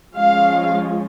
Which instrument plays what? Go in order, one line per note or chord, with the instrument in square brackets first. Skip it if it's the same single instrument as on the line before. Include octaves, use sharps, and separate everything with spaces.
[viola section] F3 G#3 C#4 F4 F5